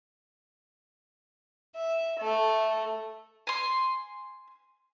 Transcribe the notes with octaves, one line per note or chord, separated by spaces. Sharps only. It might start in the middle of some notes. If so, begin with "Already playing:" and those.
E5
A3
G#5 C6